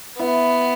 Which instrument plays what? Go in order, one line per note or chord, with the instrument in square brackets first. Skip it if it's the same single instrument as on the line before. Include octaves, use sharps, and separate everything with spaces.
[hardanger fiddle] B3 [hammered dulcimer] E4